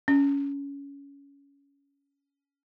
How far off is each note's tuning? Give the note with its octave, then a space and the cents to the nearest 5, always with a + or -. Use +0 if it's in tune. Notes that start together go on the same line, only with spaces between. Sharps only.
C#4 +20